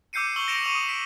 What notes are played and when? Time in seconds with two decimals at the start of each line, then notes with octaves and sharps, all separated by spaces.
0.13 D6 E6 G6 C7 C#7 D#7
0.36 C#6 E6 F#7 G7
0.48 A#6 C#7 D7 E7 F7
0.63 C#6 D6 C#7 D#7 F7 F#7
0.75 D#6
0.89 B6 D7